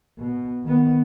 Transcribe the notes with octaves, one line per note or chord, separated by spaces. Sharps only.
B2
D#3 B3